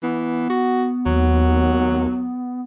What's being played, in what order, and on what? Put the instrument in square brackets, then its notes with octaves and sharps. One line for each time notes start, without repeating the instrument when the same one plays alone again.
[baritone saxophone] E3 [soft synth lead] B3
[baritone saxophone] F#4
[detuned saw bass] D#2 [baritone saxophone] F#3